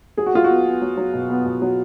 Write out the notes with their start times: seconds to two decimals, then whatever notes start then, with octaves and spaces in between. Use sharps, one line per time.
0.17 F#3 G#4
0.26 F#4
0.34 F#3 F4
0.44 F#4
0.49 B3
0.66 B3
0.82 F#3
0.97 F#3
1.13 B2
1.30 B3
1.46 B2
1.62 F#3